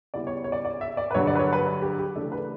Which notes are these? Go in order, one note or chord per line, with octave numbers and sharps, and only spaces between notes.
C#3 G3 B3 E4 D5
C#5
C#5
D5
D5
E5
D5
B4
G2 D3 F#3 C#5
D5
B4
C#5
B4
G4
G4
C#3 E3 A3 D4 A4
B4